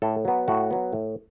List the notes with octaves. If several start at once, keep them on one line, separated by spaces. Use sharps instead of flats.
A2 A4
F#3 B3
A2 F#4
F#3 B3
A2